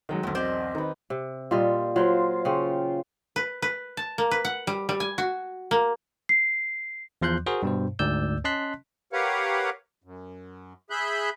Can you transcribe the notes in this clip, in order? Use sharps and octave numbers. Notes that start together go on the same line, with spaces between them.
D#3 F#3 G#3 D#5 G5
B1 E2 D3 F#3 C5
C4 C5 D5 D#5
D#3 D#4 B4
C3
A#2 G3 F4 D#5
F#3 F4 C5 G5
C#3 C#4 G5
B4
B4
A5
A#3
B4
F#5
G3
G3
G#5
F#4
A#3
C7
E2 F3 C6 F#6 G6
F#4 G#4 A#4 C5
G2 B2 C5
D2 G#2 D5 E6 G6
C#4 D#5 A5 C6 F#6 B6
G4 A#4 B4 C#5 F5 F#5
F#2
G#4 E5 B5 F#6 G6